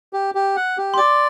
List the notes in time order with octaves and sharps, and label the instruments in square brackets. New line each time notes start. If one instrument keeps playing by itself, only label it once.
[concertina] G4
G4
F#5
G4
[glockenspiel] C6
[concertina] D5 [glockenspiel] D6